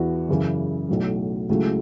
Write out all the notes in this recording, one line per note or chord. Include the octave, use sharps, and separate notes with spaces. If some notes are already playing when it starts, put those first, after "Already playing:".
Already playing: E2 E3 B3 F#4
F#2 C#3 E3
B1 A2 F#3
C#2 C#3 F#3 A3 E4